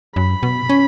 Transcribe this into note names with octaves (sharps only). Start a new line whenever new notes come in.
F#2 B5
B2
C#4